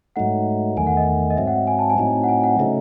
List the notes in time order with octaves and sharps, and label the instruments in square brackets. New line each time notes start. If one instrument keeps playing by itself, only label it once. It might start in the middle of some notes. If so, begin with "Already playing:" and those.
[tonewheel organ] G#2 F#3 A3 D#4 [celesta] F#5
[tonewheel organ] E2 D#3 A3 [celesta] G#5
[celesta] F#5
D#5
D#5
[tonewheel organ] G#2 F#3 C4 [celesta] E5
[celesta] F#5
G#5
A5
G#5
[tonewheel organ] A2 F#3 C4 D#4
[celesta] F#5
G#5
F#5
[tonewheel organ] C#3 F#3 A3 D#4 [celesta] E5